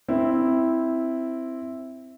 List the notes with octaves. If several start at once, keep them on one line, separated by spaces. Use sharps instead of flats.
C4 E4